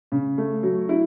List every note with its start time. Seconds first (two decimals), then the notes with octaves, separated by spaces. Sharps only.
0.12 C#3
0.38 A3
0.63 F#3
0.89 E4